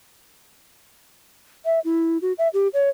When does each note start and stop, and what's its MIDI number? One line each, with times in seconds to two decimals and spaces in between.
1.65 1.79 76
1.84 2.18 64
2.22 2.33 66
2.38 2.48 76
2.54 2.68 67
2.74 2.89 73